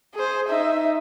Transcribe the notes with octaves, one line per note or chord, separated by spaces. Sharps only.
G#4 C5
D#4 E5